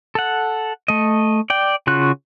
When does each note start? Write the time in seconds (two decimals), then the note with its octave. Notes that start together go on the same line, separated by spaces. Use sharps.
0.15 A4 F#5
0.88 A3 D#5
1.50 D5 G5
1.87 C#3 F4 F#4 F#6